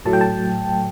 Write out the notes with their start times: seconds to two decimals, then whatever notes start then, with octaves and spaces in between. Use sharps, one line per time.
0.05 A2 F#3 A3 A5
0.13 G5
0.21 A5